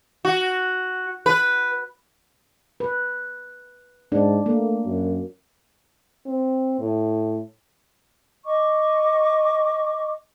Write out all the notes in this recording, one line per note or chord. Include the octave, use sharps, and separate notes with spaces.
F#4
B4
B4
G#2 D4
A3 A#3
F#2
C4
A2
D#5 C#6 D6